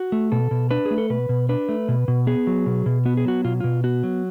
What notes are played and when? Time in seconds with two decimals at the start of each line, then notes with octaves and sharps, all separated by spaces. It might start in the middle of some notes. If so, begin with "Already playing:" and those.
Already playing: F#4
0.12 A3
0.32 B2 A4
0.51 B2
0.71 D4 B4
0.85 G#4
0.91 A3
0.98 A4
1.10 B2 B4
1.29 B2
1.49 D4 B4
1.69 A3
1.89 B2
2.08 B2
2.27 B3 G#4
2.47 F#3
2.66 B2
2.86 B2
3.05 B3 F#4
3.17 G#4
3.25 F#3 F#4
3.44 B2 F4
3.60 B2 F4
3.84 B3 F#4
4.03 F#3